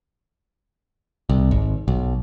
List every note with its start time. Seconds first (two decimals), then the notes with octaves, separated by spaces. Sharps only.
1.29 C2
1.51 G#1
1.88 B1